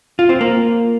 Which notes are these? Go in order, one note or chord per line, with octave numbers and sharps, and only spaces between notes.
F4
C4
A#3